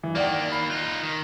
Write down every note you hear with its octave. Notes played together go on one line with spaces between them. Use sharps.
G2 E3
D#3 A#3 D5 F#5 G5
B5 C7
D#4 F4 F#6
D#3